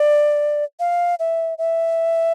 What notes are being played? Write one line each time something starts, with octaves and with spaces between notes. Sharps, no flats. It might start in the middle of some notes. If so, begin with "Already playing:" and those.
Already playing: D5
F5
E5
E5